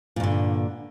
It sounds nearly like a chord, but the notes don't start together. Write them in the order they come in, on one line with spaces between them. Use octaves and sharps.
A#2 G2 D3